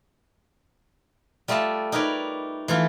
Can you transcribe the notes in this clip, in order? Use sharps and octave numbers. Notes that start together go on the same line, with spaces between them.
G3 A3 F4 D#5 A5
D#4 A#4 B4 C#5 D5
E3 A3 F4